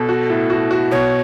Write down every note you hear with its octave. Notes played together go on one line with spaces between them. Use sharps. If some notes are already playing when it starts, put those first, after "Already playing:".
Already playing: B2 A4
F#4
A2
F#4
F#4
B2 C#5